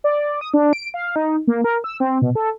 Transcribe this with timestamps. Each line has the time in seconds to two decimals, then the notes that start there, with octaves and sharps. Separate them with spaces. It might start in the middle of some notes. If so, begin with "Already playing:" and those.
0.04 D5
0.41 D#6
0.54 D4
0.73 D7
0.94 F5
1.16 D#4
1.47 A#3
1.64 A#4
1.84 E6
2.00 C4
2.22 B2
2.35 A4